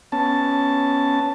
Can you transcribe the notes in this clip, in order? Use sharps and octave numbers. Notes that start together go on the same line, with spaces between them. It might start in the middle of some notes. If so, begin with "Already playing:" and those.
B3 C#4 A5